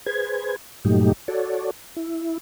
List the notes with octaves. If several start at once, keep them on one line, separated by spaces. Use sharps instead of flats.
G#4 B4 C5 G#6
G2 A#2 F#3 A3 D#4 G4
F#4 A4 C#5 D5
E4